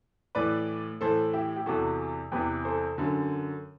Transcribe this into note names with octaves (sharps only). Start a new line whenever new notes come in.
A2 E3 B4 D5
A2 E3 A4 C5
E4 G4
G4
E2 C3 E3 F#4 A4
E2 C3 E3 G4 B4
A4 C5
F#2 D3